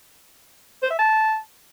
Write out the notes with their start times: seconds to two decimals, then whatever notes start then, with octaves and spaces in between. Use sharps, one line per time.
0.83 C5
0.91 E5
0.99 A5